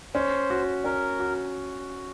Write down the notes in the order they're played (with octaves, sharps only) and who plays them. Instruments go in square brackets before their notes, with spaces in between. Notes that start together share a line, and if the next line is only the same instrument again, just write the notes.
[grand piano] C#4 [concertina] C5
[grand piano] F#4
[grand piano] C#4 [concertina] A#4
[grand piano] F#4